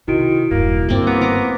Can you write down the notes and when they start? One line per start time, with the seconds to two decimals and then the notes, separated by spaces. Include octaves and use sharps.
0.08 C3 D#3 E4 F#4 D7
0.51 E1 G2 A#3
0.89 G2 A#3 C4 D5
1.07 B3 A#5
1.21 A#4 A#5 D6